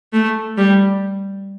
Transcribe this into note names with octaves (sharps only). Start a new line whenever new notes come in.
A3
G3